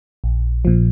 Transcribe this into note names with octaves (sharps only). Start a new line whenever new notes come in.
A#1
A#2 F3